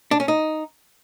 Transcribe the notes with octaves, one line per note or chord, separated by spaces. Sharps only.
D4
C#4
D#4